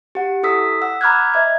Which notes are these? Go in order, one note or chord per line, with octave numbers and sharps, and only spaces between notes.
G4 F#5
E4 A4 D#6 E6 B6
F#5 E6
A#5 B5 D6 F6 F#6 G#6
D#5 E5 G#6